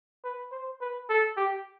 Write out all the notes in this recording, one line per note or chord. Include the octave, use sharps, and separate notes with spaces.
B4
C5
B4
A4
G4